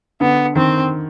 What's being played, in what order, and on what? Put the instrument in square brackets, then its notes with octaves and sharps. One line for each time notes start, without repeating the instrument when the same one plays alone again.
[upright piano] D3 [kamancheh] B3
[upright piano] D#3 [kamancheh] C4